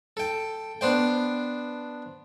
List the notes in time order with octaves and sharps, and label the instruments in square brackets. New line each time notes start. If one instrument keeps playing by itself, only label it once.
[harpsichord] A4 G5
B3 D4 C5 G5